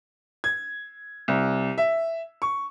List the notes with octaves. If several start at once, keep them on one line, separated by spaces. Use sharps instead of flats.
G#6
C2
E5
C#6